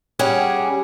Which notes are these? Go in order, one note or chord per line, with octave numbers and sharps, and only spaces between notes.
G3 C#4 G#4 F#5